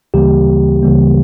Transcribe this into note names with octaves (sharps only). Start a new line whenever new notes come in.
D2 C#3 E3 G3 A#3 G4
D2 C#3 E3 G3 A#3